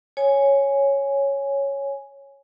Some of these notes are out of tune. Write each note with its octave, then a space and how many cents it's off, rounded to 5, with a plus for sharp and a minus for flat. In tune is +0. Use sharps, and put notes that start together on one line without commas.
C#5 +0 G#5 +0